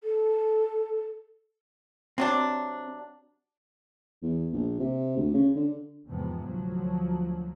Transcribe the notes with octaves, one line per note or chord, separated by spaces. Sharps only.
A4
C3 F#3 C4 D4
E2
A#1
C3
D2
C#3
D3
E2 G#2 C3 F3 B3
D2 F3 F#3